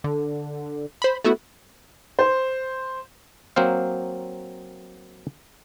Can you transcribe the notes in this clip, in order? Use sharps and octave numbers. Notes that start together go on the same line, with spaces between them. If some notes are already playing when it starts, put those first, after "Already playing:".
D3
C5 B5
A3 B3 E4 F#4
C5
F#3 A#3 C4 C5 F5